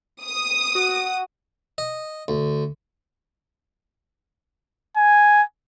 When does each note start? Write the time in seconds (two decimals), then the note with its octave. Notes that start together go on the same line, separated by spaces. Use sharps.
0.21 D#6
0.75 F#4
1.78 D#5
2.28 D2
4.97 G#5